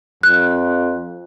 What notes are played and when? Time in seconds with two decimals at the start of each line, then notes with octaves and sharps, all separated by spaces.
0.23 F2 F#6